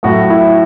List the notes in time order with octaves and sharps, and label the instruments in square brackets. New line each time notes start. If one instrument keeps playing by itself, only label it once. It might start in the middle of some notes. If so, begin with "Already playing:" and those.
[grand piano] A2 F#3 A3 F#4
E4